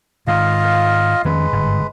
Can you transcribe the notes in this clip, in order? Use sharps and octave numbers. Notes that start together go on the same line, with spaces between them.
G#2 D#3 F4 D#5 F5
F2 D#3 G#3 C#4 B4
G1 G#2